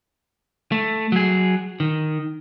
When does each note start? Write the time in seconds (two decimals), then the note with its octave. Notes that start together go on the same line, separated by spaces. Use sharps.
0.72 A3
1.12 F#3 G#4
1.80 D#3